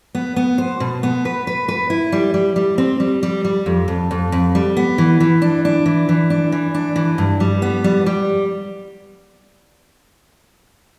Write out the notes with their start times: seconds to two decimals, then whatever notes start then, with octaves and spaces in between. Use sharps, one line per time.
0.15 B3
0.36 B3
0.58 C5
0.80 B2
1.03 B3
1.25 B4
1.47 B4
1.68 B4
1.90 E4
2.12 G3
2.34 G3
2.56 G3
2.78 C4
3.00 G3
3.23 G3
3.44 G3
3.66 F2
3.88 F2
4.11 F2
4.32 F2
4.55 G3
4.77 B3
4.98 E3
5.20 E3
5.42 D4
5.65 D4
5.86 E3
6.09 E3
6.30 D4
6.52 E3
6.74 D4
6.96 E3
7.18 G2
7.40 G3
7.62 B3
7.84 G3
8.06 G3